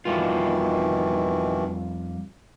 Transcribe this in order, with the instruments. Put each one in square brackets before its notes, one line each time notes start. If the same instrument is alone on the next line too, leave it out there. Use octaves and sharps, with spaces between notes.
[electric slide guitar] F2 G3 F4 [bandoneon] B2 D#3 E3